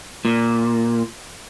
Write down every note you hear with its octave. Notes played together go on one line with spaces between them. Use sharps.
A#2